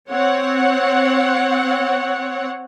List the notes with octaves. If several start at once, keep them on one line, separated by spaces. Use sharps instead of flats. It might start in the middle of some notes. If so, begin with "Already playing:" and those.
C4 C#5 F#5